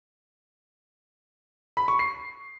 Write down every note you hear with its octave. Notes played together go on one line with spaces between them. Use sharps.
B5
C#6
C7